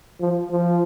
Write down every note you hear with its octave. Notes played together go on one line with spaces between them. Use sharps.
F3
F3